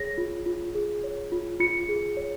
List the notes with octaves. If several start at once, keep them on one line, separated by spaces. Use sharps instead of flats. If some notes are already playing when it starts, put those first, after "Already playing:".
Already playing: G#4 C#5 A#6
F4
F4
G#4
C#5
F4
F4 C#7
G#4
C#5